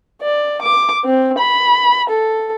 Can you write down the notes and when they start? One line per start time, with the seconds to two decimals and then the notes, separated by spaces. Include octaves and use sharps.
0.22 D5
0.62 D6
1.05 C4
1.38 B5
2.09 A4